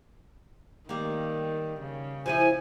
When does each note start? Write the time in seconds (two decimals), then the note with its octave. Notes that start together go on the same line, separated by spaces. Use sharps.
0.89 D#3 G3 A#3
1.80 C#3
2.26 F3 G3 E4 G#5